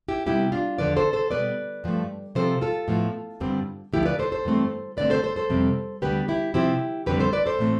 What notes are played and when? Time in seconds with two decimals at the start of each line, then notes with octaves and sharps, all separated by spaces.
0.08 E4 G4
0.26 C3 G3 B3 E4 G4
0.52 D4 F4
0.78 E2 D3 F3 B4 D5
0.97 A4 C5
1.13 A4 C5
1.31 B2 G3 B3 B4 D5
1.84 G2 F3 A3
2.35 C3 F3 C4 A4 C5
2.61 F4 A4
2.88 A2 F3 B3
3.40 G2 D3 G3 C4
3.93 D2 D3 F3 E4 G4
4.05 B4 D5
4.19 A4 C5
4.32 A4 C5
4.45 G2 E3 A3 C4
4.97 G2 D3 A3 C4 B4 D5
5.10 A4 C5
5.23 A4 C5
5.36 A4 C5
5.50 F2 C3 G3 C4
6.02 D2 D3 G3 B3 G4 B4
6.28 E4 G4
6.54 C3 F3 C4 E4 G4
7.06 F2 D3 G3 C4 G4 B4
7.19 A4 C5
7.33 B4 D5
7.46 A4 C5
7.59 A2 E3 A3 C4